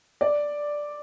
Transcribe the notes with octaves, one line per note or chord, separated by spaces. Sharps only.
D5